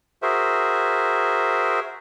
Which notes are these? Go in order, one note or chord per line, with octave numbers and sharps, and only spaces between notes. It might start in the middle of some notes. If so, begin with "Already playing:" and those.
F#4 G#4 A#4 C5 E5